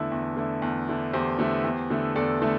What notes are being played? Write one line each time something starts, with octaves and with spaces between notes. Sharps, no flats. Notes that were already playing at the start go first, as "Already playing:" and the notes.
Already playing: E2 D3 A3 E4
E2
D3 A3 E4
E2
D3 A3 E4
E2 G4 C5
D3 A3 E4
E2
D3 A3 E4
E2 A4 D5
D3 A3 E4